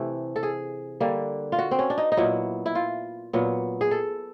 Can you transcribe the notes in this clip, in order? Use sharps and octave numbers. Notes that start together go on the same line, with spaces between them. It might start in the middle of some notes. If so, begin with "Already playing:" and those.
Already playing: C3 E3 A3
A4
G#4
D3 G3 A#3
F4
F#4
C4
C#4
D4
D#4
D#4
A#2 F#3 B3 E4
E4
F4
A#2 F#3 B3
G#4
A4